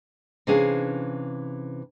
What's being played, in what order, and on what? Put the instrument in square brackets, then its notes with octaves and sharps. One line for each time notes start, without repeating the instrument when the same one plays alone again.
[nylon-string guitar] C3 E3 C#4 D4 G#4 F5